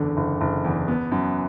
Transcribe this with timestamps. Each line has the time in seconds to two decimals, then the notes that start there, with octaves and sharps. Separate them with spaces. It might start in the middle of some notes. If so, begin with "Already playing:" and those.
Already playing: F#1 E2 D3
0.17 F#1
0.41 F#1
0.65 E2
0.88 B3
1.12 F#2